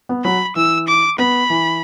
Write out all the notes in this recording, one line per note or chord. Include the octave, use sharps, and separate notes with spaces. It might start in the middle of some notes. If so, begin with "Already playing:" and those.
B3
F#3 B5
E3 E6
D6
B3 B5
E3